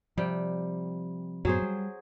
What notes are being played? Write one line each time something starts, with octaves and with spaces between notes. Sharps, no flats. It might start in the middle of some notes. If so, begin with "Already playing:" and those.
C3 F3 G3 G5
F#2 A2 F#3 B3 G#4 C5
G3